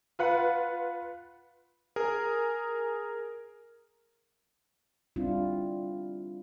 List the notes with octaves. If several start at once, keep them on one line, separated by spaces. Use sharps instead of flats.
F4 B4 F#5
G#4 A#4
G3 C4 D4 E4 F4